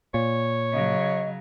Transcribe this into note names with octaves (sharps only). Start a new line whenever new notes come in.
A#2 C#5
C#3 F#3 D#5